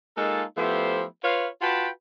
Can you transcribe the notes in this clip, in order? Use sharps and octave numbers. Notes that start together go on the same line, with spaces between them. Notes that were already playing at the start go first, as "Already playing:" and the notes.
G#3 A#3 D#4 F4 A4
F3 A3 B3 E4 G4 C5
F4 B4 C#5 F5
F4 F#4 B4 G5 A5 B5